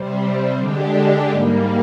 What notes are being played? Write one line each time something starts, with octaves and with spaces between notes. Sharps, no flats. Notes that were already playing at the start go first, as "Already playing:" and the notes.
Already playing: C3 G3 C4
D3 G#3 D4 G4
G#2 G3 A#3